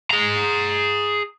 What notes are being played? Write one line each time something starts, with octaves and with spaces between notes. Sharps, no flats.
G#4 A#5